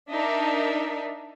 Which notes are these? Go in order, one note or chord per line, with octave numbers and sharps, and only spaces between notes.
D4 D#4 A#4 D5 E5